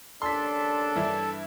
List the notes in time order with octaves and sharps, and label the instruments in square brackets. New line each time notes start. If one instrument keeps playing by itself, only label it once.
[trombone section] D#2 C#3 D4 [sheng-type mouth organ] A4 [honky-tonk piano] C6 B6
[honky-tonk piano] G2 E3 E4